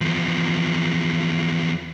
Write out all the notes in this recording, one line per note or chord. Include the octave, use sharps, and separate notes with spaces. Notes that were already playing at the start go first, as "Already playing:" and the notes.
E2 F3